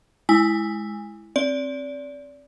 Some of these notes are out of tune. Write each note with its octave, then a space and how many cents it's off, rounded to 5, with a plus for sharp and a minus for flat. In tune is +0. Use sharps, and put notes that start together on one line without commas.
G#3 +20 E4 +0 G#5 -20
C4 +20 D5 -25